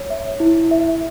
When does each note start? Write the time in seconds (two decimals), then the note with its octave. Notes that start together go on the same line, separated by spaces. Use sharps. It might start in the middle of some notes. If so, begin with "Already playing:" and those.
Already playing: C#5
0.10 E5
0.40 E4
0.71 E5